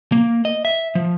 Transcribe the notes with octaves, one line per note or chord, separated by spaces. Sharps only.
A#3
D#5
E5
F3